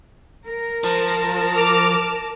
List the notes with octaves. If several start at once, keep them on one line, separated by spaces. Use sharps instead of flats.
A#4
F3 A5
D6 F6